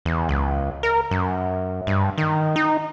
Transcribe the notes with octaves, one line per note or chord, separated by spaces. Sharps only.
E2
C#2
A#4
F#2
G2
D#3
D#4